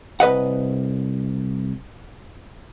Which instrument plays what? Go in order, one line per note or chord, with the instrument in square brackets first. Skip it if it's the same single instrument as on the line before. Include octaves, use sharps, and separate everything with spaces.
[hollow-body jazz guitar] C2 B4 D#5 F#5